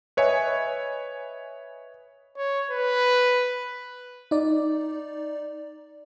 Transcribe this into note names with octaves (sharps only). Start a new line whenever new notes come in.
B4 C#5 D#5 E5 G#5
C#5
B4
D#4 D5